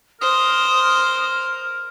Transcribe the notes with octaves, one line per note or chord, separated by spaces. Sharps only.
A#4 C5 D#6